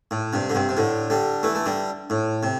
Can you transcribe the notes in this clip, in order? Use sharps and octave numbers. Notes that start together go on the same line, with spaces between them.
A2
G2 C3
D3
G2 C3
C3
A2 D3
D3 G3
E3 A3
A3
D3 G3
A2
C3